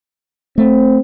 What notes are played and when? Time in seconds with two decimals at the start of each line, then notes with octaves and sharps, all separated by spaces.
0.58 A3 C4